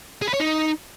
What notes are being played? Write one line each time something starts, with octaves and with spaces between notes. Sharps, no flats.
G#4
B4
C#5
D#4